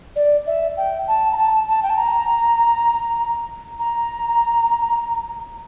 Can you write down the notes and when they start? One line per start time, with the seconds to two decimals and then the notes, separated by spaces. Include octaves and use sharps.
0.16 D5
0.47 E5
0.77 G5
1.08 A5
1.32 A#5
1.38 A5
1.67 A5
1.83 G5
1.90 A5
1.97 A#5
3.79 A#5